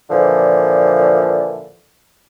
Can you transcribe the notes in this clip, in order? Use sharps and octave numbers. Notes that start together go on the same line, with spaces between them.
A#2 D3 E3 F3